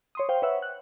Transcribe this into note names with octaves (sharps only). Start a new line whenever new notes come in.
C#5 C6 D#6
C5 F5 G5
B4 C#5 E5 F#5 E6
F#6